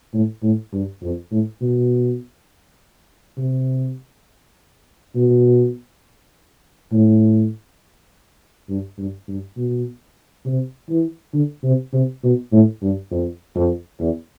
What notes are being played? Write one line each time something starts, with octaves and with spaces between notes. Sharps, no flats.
A2
A2
G2
F2
A2
B2
C3
B2
A2
G2
G2
G2
B2
C3
E3
D3
C3
C3
B2
A2
G2
F2
F2
E2